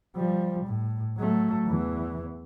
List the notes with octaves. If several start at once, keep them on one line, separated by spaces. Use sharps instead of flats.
F3 G3
A2
F#3 A3
E2 E3